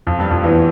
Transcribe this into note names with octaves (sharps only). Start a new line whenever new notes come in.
F2 F3
G2 G3
F2 F3
E2 E3